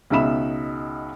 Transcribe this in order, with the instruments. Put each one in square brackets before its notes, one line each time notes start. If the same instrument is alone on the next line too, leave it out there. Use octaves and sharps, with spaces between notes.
[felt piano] C#2 B2 D#4 E5 B5 E7